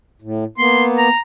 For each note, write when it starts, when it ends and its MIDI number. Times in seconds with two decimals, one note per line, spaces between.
0.22 0.44 45
0.58 1.08 58
0.58 1.08 59
0.58 0.84 84
0.97 1.20 82